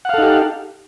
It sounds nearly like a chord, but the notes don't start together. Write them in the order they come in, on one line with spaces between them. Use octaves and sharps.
F#5 F5 A4 D#4 G4